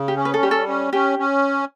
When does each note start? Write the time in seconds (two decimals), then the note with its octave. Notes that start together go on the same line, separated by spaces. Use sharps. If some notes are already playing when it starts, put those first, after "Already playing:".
Already playing: C#3
0.08 G4
0.17 C#4
0.25 B4
0.34 A4
0.42 G3 G4
0.51 A4
0.68 C#4
0.93 C#4 G4
1.19 C#4